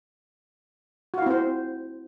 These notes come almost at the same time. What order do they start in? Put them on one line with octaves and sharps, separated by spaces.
F#4 F5 E4 C4 C5